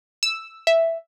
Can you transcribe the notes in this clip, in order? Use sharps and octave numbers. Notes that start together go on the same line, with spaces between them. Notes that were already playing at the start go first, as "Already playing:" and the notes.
E6
E5